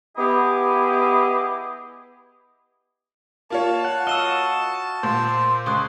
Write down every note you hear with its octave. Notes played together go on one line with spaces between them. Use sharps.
B3 E4 G4 G#4 D#5
A#3 F4 C#5 A5
F#5
F#4 D#5 F5 E6 E7 G7
A#2 C5
C#2 C#6 D#6 F#6